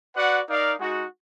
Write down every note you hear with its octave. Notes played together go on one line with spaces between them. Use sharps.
F#4 B4 D5 F#5
D#4 A#4 D5 F5
G#3 D#4 F#4